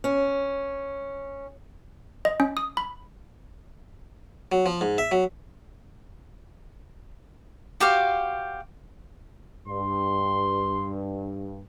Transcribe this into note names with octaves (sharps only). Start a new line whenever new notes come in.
C#4
D#5
C#4
D#6
B5
F#3
F3
G#2
E5
F#3
F#4 G4 C5 F5
G2 C6